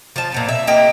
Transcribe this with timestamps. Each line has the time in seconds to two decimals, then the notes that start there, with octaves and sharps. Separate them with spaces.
0.16 F3 A5
0.32 A#2 F3 B3
0.49 E5
0.67 A#3 G4 D#5